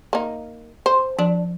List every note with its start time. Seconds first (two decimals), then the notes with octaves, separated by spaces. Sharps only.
0.13 A#3 D#4
0.86 C5
1.19 F3 D4